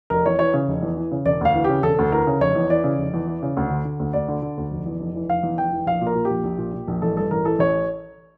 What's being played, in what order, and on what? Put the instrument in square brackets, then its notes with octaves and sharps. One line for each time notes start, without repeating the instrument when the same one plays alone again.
[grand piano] F1 A#4
E2 C#5
E3 C#5
C#3
F1
E2
E3
C#3
E1 D5
D2 F5
E3
C#3 G4
E1 A4
D2
E3 A#4
C#3
F1 C#5
E2
E3 D5
C#3
F1
E2
E3
C#3
D2
D3
D3
D2
D2 D5
D3
D3
D2
F1
E2
F1
E3
F1 F5
E2
F1 G5
E3
A#1 F5
A#2
A#4
A#2
G4
A#1
A#1
A#2
A#2
A#1
A1 A4
G2 A4
A1 A#4
E3 A4
A1 C#5